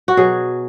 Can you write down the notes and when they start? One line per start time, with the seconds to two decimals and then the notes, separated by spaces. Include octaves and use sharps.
0.08 F#4
0.17 B2 F#3 G#4